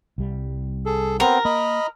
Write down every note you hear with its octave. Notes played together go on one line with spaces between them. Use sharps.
C2 G3
G#4 A4
B3 C4 A#4
A#3 D#5 B5